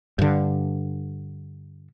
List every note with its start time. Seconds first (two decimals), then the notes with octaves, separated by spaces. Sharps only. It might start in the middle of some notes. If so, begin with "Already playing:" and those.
0.19 G2 D3